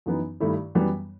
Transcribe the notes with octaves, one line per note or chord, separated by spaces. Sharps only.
F#2 E3 B3 D#4
G2 D#3 A3 E4
F#2 E3 G3 B3